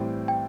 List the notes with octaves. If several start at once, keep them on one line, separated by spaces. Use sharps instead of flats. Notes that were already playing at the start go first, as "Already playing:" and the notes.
Already playing: A2 E3 G3 C4
G5